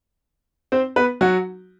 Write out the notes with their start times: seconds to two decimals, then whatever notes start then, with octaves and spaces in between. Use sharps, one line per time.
0.72 C4 C5
0.96 B3 B4
1.21 F#3 F#4